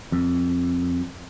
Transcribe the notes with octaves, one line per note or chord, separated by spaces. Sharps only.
F2